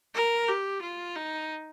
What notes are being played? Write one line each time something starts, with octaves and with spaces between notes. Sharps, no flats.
A#4
G4
F4
D#4